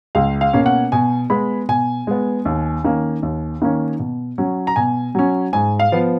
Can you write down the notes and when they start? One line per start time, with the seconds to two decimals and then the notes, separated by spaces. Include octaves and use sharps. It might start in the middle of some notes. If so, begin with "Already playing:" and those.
0.15 C#2 F5
0.41 F5
0.53 B2 A#3 C#4
0.66 F#5
0.92 B2 G#5
1.30 G#3 B3 B5
1.69 B2 G#5
2.07 G#3 B3
2.45 D#2
2.84 D#3 A#3 C#4
3.23 D#2
3.62 D#3 A#3 C#4
3.99 B2
4.38 F#3 C#4
4.67 A#5
4.76 B2 G#5
5.15 F#3 C#4
5.53 G#2 G#5
5.80 F5
5.92 F3 B3